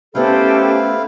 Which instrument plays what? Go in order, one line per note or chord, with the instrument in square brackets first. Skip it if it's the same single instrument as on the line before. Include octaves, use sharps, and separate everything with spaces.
[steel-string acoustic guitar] A3 B3 [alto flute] C#4 [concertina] E4 F5 [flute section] G4 A4 C5